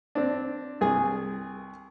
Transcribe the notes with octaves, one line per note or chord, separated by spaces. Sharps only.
C4 D4
C2 G#4